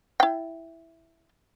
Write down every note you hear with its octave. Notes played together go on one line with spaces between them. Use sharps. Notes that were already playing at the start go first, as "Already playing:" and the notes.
E4 G5